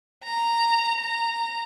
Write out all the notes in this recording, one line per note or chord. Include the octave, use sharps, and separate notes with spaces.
A#5
A#5